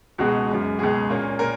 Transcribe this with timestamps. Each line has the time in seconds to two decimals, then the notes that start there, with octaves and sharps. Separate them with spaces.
0.18 C#2 B2 G#3 F#4
0.49 F#2 C#3 G#3
0.79 C#2 B2 G#3 G#4
1.10 A#2 A#3 C#4
1.39 A#2 A#4